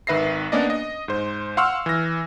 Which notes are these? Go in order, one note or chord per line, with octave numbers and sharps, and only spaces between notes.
G#1 D#3 B4 E5 A#6 C7
A#3 B3 C#4 D4 D5 D#5
D#5
G#2 C5
F5 F#5 C6 C#6 E6 F6
E3 A#6